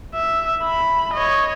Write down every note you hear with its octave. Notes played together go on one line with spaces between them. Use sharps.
E5
B5
C#5 D#5